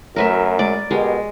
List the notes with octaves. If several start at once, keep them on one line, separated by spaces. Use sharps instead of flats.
F#2 F#3 A3 A#4 B4 E5
G#3 D5
B2 G#3 G4 A#4